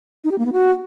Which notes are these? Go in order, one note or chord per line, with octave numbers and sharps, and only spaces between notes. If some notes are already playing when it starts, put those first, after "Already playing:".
D#4
G4
A#3
B3
F#4